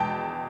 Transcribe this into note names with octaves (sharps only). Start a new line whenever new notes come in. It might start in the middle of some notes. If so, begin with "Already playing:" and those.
Already playing: E2 B2 G#3 G5 A5